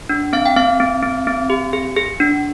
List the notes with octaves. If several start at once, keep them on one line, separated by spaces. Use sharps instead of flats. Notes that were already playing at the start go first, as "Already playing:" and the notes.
D4
C4 F5
G5
C4 F5
C4
C4
C4
G4
G#4
G#4
D4